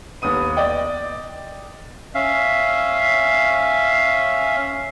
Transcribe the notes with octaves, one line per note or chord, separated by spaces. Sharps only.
D#2 B3 D#6 D#7
D5 D#5 G5
C#4 E5 F5